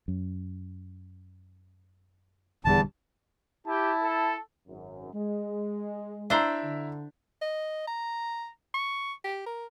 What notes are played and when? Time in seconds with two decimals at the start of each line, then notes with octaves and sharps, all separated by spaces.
0.08 F#2
2.65 D#1 E2 D3 G3 A5
3.67 E4 G4 A5
4.03 A4
4.67 G#1 F#2
5.14 G#3
6.30 D4 E4 C5 E5 A#5
6.63 D3
7.42 D#5
7.87 A#5
8.74 C#6
9.24 G4
9.46 A#4